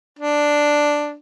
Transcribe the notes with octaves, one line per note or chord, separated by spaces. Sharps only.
D4